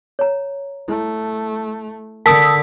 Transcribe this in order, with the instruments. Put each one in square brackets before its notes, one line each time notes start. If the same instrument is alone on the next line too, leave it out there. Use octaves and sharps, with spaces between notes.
[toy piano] C#5 A#5
[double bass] A3 [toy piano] E4
[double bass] D3 [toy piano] A#4 [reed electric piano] A5 [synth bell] D#6 E6 B6